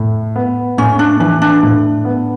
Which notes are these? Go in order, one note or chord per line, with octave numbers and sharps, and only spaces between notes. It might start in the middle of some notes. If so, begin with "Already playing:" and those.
Already playing: A2
B3
A2 C#4
D4
E3 D4
D4
A2
B3